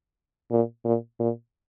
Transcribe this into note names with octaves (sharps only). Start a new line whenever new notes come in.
A#2
A#2
A#2